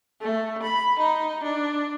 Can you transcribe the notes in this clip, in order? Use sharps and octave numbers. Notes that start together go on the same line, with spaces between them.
A3
B5
D#4
D4